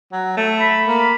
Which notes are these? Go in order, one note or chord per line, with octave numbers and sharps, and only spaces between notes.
F#3
A3
B5
A#3